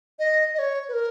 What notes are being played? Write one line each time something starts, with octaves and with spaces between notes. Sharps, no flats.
D#5
D#5
C#5
B4
A#4